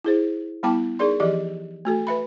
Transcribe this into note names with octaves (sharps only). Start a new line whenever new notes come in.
E4 G#4 C5
G3 B3 E4 G5 A5 D6
D#4 G#4 A#4 D5 C6
E3 F3 G4 D5 D#5
A3 F#4 A4
B4 E5 B5